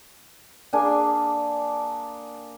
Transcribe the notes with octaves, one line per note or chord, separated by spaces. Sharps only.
A#3 D4 G#4 G#5